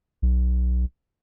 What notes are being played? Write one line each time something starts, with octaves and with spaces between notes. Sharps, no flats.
B1